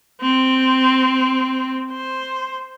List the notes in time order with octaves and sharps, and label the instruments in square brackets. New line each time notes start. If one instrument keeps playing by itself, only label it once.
[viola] C4
C5